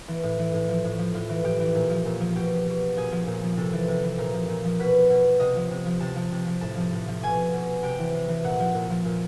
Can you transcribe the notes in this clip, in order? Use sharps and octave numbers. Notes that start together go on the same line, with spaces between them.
E3
A2
E3
A2
F3
A2
F3
A2 F4
E3
A2 G4
E3
A#2
F3
A#2
F3
B2 G4
B2
A#2 G#4
F3
A#2
F3
C3 A4
E3
C3
E3
A#2 A#4
F3
A#2
F3
B2 B4
B2
C3 D#5
F3
C3
F3
C3 A5
F3
C3
F3
A2 A5
F3
A2
F3
B2 G#5
B2
C3 G5
E3
C3
E3
A#2 F#5
F3
A#2
F3
A#2